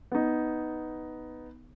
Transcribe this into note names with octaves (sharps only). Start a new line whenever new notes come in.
B3 D#4